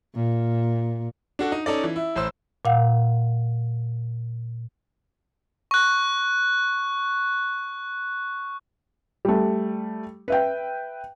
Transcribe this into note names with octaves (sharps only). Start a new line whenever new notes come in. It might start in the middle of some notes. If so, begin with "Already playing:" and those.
A#2
D4 F#4 A4
D#4
C#4 D#4 A4 D5
E3
E4
A1 C5 E6
A#2 F5 F#5
C#6 F#6
G3 A3
B4 E5 G5